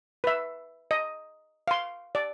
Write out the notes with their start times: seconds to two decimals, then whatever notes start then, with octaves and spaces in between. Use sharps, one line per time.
0.24 B4 E5
0.91 D#5
1.68 F5 C6
2.15 D5